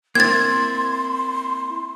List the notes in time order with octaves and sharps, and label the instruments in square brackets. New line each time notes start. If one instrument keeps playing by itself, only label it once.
[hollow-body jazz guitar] A#3 C4 E4 [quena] C6 [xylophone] G#6 A6